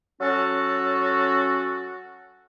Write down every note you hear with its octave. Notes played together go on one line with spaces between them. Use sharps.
F#3 C#4 F#4 A4